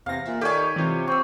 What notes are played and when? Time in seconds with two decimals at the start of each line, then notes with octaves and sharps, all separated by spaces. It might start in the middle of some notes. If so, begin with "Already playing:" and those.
0.06 E2 C3 F5 A#6
0.26 A#2 E5
0.41 D#3 G4 A4 C#5 D5 G#5
0.76 C3 E3 F4
1.07 C4 C#6 E6